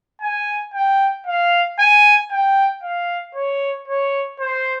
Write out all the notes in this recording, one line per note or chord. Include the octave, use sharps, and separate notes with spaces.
G#5
G5
F5
G#5
G5
F5
C#5
C#5
C5